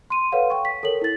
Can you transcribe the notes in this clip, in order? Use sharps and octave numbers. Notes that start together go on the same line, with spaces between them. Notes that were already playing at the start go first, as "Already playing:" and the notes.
C6 D#7
A4 B4 C#5 F5 F#5
G5 C#6
B6
A4 A#4 C#5 F#7
E4 A6